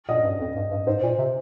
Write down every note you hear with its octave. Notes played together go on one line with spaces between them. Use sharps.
A#2 D#5
G2
F2
G2
G2
G#2 C5
A#2
C3